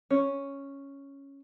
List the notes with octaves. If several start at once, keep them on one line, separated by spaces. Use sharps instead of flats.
C#4